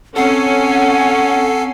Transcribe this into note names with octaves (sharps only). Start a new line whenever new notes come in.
C4 C#4 A4 F#5 G#5 C7
C4